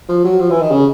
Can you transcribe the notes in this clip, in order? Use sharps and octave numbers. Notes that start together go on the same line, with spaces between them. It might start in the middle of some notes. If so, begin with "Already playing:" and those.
F3
F#3
F3
E3
D#3
C#3